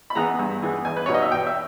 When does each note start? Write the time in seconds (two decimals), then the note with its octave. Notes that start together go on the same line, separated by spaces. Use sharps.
0.10 B5
0.15 E3 G#3 B3 A#5
0.39 G2
0.62 E3 G#3 B3
0.85 E2 G#5
0.97 B4
1.06 B2 G3 B3 D#4 C#5
1.14 D#5
1.22 E5
1.32 E2 G5
1.46 E5